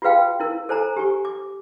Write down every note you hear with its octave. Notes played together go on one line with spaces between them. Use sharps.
F4 F#4 G#4 B4 F5 G5
E4 A#4
A4 C5 G#5 A#5
G4 G#5 C#6
D6